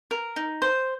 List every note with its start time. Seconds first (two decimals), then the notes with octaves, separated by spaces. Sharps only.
0.11 A#4
0.36 D#4
0.62 C5